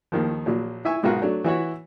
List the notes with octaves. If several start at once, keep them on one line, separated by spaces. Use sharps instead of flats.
D#2 D#3 F3
A#1 A#2 F#3
E4 E5 G#5 C#6
B1 G#2 F4 F#4 A#4 F#5
F#3 A3 D4
E3 E4 F#4 C#5